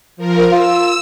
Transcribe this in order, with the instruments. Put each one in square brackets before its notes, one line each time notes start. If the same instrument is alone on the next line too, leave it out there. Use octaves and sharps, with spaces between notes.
[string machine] F3 A#4
[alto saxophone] F4 [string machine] E6